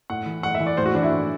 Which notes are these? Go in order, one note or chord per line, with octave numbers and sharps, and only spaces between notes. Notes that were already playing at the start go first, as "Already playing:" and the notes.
A2 F#5
E3
A2 F#5
E5
E3
D5
A2 C5
F#4
E3 D4
E4
A2